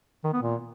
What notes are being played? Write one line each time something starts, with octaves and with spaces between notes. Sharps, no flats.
D#3
B3
A#2